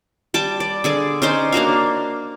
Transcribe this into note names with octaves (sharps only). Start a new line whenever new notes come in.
G3 A5 D6
D5
D3 G#4 D5
C#4 D#4 C5 D5
A#3 D4 F#4 F5